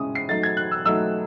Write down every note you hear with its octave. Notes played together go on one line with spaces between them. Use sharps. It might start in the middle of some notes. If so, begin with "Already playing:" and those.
Already playing: C#3 G#3 C#4 E4 D#6
C7
F#3 A3 D#4 A6
G#6
F#6
E6
F#3 A3 D#4 E6